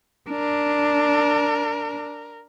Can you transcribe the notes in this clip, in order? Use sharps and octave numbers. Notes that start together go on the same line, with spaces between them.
D4 A#4